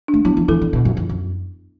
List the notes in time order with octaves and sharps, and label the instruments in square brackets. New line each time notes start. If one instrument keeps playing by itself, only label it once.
[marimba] D4
[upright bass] A3
[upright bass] F#3 [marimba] B3 E4
[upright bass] E3
[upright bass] E3 [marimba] E4 A4
[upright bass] D3
B2
F#2
E2
F#2